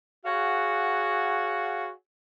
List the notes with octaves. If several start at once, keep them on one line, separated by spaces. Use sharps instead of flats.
F#4 G#4 C#5 F5 F#5